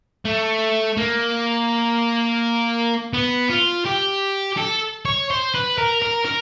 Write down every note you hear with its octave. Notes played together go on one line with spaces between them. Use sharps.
A3
A#3
B3
F4
G4
A4
C#5
C5
B4
A#4
A#4
A#4